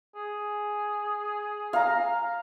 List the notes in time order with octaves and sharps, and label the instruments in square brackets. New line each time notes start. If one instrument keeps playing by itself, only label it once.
[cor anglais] G#4
[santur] F5 A#5